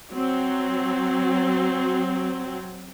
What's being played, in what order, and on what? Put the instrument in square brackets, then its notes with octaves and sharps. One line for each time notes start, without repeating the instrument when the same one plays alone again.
[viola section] F#3 C4